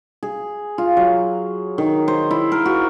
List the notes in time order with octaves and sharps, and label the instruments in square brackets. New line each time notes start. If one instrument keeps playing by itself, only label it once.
[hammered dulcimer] G#4
F4
F#3
D#3
C5
E4
A#4
F#4